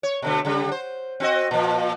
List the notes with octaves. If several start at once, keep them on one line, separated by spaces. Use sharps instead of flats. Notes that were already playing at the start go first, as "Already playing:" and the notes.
C#5
B2 D3 A3
C#3 G3
C5
C4 F#4 D#5
A#2 F3